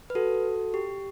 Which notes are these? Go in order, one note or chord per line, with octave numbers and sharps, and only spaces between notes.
B4
F#4 A4
G4